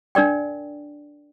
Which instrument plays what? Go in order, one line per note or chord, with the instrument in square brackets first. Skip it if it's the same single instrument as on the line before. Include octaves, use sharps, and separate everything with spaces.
[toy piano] D4 A#4 D5 G5